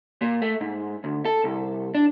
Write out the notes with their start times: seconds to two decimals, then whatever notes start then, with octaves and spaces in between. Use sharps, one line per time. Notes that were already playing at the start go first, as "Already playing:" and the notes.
0.22 A#2
0.42 A3
0.61 G#2
1.04 D2
1.25 A4
1.44 C2
1.95 D4